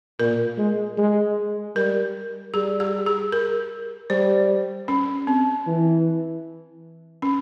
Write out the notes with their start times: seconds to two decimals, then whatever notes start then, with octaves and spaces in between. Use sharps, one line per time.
0.20 A#2 A#4
0.58 G#3
0.97 G#3
1.75 G3 A#4
2.54 G3 G#4
2.80 G4
3.06 G#4
3.32 A#4
4.10 G3 C5
4.88 C#4
5.27 C4
5.67 E3
7.22 C#4